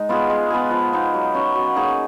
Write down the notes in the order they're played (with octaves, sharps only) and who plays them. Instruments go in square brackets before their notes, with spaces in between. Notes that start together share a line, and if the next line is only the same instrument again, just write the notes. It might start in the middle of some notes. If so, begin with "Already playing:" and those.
Already playing: [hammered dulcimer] G#3 D#4
B3 F4 G#4
G#3
B3 F4 G#4
F3
B3 D#4
F#3
C#4 F#4
F#3
A#3 D#4 G#4